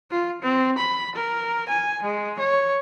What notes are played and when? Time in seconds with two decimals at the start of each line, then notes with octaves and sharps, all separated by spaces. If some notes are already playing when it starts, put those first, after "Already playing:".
0.11 F4
0.42 C4
0.78 B5
1.15 A#4
1.69 G#5
2.03 G#3
2.39 C#5